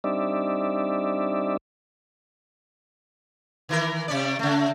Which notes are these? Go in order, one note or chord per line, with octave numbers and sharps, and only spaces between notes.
G3 C4 D4 D#4 D5 E5
D#3 E3 A#4
C3 C#4 D5
C#3 A3